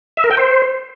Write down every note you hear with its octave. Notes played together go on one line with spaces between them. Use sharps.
E5
A#4
G5
C5